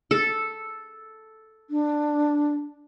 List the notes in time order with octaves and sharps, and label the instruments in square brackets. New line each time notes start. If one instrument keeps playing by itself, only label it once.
[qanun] A4
[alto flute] D4